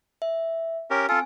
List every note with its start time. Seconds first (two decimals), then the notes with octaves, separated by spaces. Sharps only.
0.22 E5
0.90 C#4 G4 A#4
1.09 C4 F4 A4 G#5